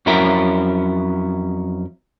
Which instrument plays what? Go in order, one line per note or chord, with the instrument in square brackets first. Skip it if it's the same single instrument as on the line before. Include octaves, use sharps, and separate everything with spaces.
[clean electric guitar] F2 F#3 C#4 E4 A#4